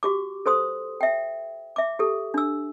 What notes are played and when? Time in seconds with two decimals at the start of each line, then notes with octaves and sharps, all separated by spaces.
0.03 F#4 G4 D6
0.46 A4 C5 C6 D#6
1.01 E5 G5
1.76 E5 D6
1.99 G4 A4
2.34 D4 E6